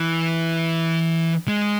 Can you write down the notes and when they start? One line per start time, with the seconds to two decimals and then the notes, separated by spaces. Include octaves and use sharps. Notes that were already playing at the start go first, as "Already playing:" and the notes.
Already playing: E3
1.48 G#3